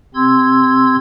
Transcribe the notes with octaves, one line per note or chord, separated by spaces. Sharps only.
C3 C4 C6 E6 G#6